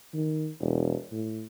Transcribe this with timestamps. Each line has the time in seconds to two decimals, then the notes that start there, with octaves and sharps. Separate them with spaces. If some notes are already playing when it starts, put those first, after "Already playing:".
0.14 D#3
0.61 E1
1.12 A2